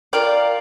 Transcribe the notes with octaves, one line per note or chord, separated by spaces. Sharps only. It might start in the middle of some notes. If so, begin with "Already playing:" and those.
F4 A#4 D5 G5